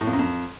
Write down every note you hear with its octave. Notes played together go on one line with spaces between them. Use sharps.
A2
F2
F#2
F2